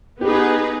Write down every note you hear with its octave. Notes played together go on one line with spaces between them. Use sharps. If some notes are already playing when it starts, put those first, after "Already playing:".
B3 D#4 G4 G#4 B4